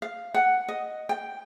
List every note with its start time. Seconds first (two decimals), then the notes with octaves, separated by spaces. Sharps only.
0.02 F5
0.34 F#5
0.68 D#5
1.09 G5